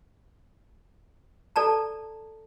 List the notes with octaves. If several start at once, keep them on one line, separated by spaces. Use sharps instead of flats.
A4 D5 A5 A#5